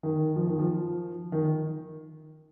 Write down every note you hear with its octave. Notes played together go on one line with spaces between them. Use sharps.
D#3
F3
D#3
F3
D#3